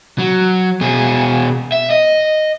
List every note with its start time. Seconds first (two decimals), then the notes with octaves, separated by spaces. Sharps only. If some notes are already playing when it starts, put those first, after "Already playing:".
0.19 F#3
0.81 B2 G#4
1.72 E5
1.91 D#5